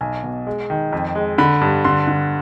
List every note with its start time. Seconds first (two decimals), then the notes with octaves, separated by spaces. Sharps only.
0.01 B1 G#5
0.23 B2
0.47 G#3
0.70 D#3
0.93 F2
1.15 G#3
1.38 D3 B5
1.61 G2
1.84 D3 C6
2.07 D3